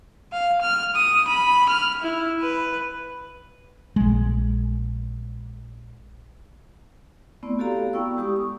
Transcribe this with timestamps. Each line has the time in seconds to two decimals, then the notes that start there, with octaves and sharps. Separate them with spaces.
0.32 F5
0.61 F6
0.95 D#6
1.27 B5
1.69 F6
2.02 E4
2.42 B4
3.96 A#1 G#3
7.43 A3 B3 C4 E4 D5
7.59 F#4 G4 A4 D5 F5 A#5
7.93 B3 E4 G5 C#6 E6
8.17 G#3 G4 C#6 D#6
8.36 C#6